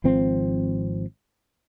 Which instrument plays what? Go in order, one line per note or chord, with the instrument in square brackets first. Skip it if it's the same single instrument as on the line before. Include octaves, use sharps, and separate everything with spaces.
[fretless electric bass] G#1 F3 C4